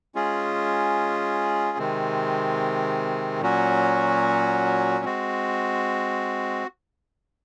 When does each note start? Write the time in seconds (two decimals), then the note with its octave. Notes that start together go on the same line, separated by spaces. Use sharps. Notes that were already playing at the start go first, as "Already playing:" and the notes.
0.15 G#3 C#4 F4 G#4
1.78 C3 D#3 G#3 C4
3.41 A#2 F#3 C#4 F#4
5.05 G#3 C4 F#4